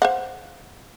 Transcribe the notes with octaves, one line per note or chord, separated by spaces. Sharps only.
C5 F5 F#5